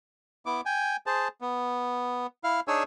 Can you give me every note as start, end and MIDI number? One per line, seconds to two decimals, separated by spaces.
0.46 0.61 59
0.46 0.61 64
0.46 0.61 86
0.66 0.96 79
0.66 0.96 80
1.06 1.28 68
1.06 1.28 72
1.06 1.28 81
1.41 2.27 59
2.44 2.60 64
2.44 2.60 77
2.68 2.83 62
2.68 2.83 63
2.68 2.83 68
2.68 2.83 73
2.68 2.83 80
2.68 2.83 88